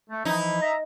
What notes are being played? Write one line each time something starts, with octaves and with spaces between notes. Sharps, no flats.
A3
E3 F3 D#4 E4
D#5 E5 A#5